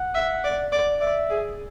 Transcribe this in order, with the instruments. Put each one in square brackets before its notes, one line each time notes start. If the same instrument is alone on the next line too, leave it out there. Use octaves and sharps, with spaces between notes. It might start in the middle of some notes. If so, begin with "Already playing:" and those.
Already playing: [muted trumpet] F#5
[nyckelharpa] E5
D5
D5
[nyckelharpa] D5 [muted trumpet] E5
[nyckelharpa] G#4